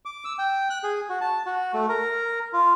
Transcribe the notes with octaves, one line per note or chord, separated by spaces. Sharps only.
D6
E6
G5
F#6
G#4
F#4
A5
F#4
A3
A#4
F4